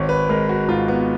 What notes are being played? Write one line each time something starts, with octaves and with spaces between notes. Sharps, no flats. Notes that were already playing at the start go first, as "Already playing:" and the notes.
Already playing: G#1 C#5
B4
G#3 A#4
F#4
G#2 F4
B3